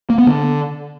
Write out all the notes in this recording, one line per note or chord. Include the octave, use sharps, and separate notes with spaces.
A#3
B3
D3